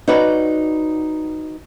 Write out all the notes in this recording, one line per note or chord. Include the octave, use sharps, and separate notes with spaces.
D#4 F#4 B4 C#5 D5